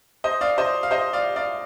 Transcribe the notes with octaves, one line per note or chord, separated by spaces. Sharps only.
C5 D#5
D5 F5
C5 D#5
F5
C5 D#5
D5 F5
D5 F5